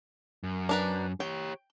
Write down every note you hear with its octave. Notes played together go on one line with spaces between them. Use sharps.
F#2
D4 A#4 B4
G4 C#5 G5